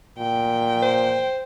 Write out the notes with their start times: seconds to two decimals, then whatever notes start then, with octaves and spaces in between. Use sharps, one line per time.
0.19 A#2 G5
0.82 C5